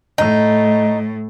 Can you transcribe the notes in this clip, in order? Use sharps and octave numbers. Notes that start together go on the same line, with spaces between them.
A2 D#4